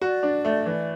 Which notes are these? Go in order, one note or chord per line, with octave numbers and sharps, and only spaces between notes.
F#4 D5
D4
A3
E3